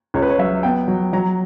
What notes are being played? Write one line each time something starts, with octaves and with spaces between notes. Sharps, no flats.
C#2 C#5
B4
C#5
F#3 E5
B3 G5
F#3
F#3 A#5